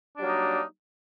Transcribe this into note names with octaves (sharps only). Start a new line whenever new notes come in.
F#3 G3 A#3 D4 D#4